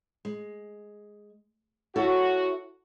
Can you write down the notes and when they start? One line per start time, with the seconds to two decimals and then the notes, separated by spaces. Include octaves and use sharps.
0.25 G#3
1.96 E4 F#4 A4 C#5